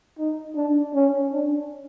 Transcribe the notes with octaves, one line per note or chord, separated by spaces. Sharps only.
D#4
D4
C#4
D4